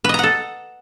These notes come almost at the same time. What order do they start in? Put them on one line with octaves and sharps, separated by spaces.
B4 D#5 A#5 F#5 A4